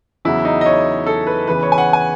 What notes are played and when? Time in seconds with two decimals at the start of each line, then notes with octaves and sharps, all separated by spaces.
0.25 E2 C#3 F#3 E4
0.45 D#4
0.61 D#5
0.66 C#5
1.06 A4
1.27 B4
1.47 E2 C#3 E3 B4
1.63 C#5
1.72 G#5
1.78 F#5
1.93 G#5